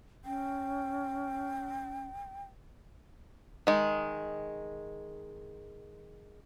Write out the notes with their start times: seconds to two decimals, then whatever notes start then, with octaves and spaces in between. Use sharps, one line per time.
0.25 C#4 G5
3.67 D#3 G#3